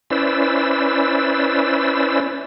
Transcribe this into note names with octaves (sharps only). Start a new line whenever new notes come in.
C#4 E4 B4 C5 D5 E6